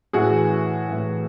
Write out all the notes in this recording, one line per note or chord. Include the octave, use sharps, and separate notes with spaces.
A2 E3 F#4 G#4
A2 E3